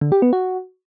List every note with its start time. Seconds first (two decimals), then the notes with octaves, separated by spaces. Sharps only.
0.01 D3
0.12 G4
0.22 B3
0.33 F#4